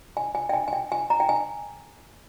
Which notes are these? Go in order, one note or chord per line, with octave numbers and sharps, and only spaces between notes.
G#5
G#5
G5
G#5
G#5
G5
G#5
A#5
G5
G#5